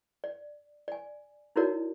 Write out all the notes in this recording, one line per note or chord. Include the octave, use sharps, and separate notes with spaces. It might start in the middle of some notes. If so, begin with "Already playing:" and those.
D5
D5 G#5
D#4 E4 F#4 A#4 C#5 D5